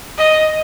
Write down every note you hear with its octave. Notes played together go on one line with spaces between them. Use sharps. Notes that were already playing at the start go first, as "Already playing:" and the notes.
D#5